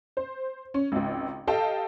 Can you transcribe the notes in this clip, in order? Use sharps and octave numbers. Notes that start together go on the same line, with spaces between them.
C5
C#4
G#1 C#2
G4 A4 D#5 F5 G5 A5